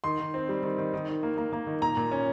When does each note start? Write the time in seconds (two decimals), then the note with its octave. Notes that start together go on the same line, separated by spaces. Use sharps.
0.04 D#3 C6
0.19 D#3
0.34 C4
0.49 G3
0.63 D#3
0.78 D#3
0.94 D#3
1.08 D#3
1.23 A#3
1.37 A#3
1.53 A#3
1.67 D#3
1.82 A#2 A#5
1.97 A#2
2.12 C#4